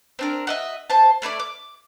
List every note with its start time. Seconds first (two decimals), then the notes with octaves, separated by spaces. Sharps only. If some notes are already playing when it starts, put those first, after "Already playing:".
0.19 C4 D4 A#4
0.47 F#4 D#5 E5
0.90 C5 A5
1.22 A3 E4 B4 D5
1.40 D6